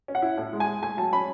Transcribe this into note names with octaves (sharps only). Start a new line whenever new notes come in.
C#4
F#5
E4
A2
G#3
G#5
G#3
A3 G#5
F#3 A5
C#4 B5